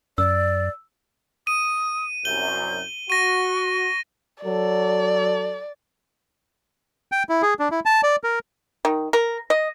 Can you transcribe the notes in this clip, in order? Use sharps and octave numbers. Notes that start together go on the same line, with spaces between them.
F#2 D5 E6
D#6 D#7
C2 F#2 G6 G7
F#4 C#6 A#6 D#7
F#3 A4 D5
G5
E4
G#4
D4
E4
A5
D5
A#4
D#3
A#4
D#5